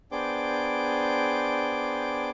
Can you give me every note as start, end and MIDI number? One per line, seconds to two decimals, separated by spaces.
0.12 2.30 59
0.12 2.30 62
0.12 2.30 68
0.12 2.30 72
0.12 2.30 79
0.12 2.30 86